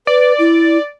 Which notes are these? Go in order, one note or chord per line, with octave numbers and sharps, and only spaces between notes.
B4 D5
E4